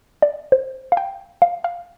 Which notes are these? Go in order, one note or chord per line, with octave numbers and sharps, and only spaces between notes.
D5
C5
F5
G5
F5
F5